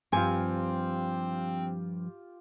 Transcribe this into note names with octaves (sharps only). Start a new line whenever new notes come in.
G2 F3 C4 F4 G4 G#5